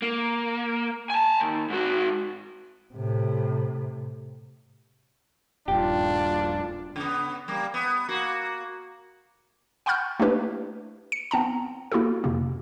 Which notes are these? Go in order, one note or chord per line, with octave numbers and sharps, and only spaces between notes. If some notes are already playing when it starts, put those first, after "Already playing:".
A#3
G#5 A5
D#2
G#2 F#4
A2 C3
D#1 G2 D4 F4 G4
C#3 B3
G3 A#3
B3
A#3 F#4
F#5 G5 B5 C#6 F6 G6
A3 A#3 D4 E4 G4 B4
C#7
B3 C4 A5 A#5
A#3 E4 F#4 G4 A4
F2 C3 A#3